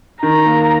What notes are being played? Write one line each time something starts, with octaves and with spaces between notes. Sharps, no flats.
D#3 A#5
A#3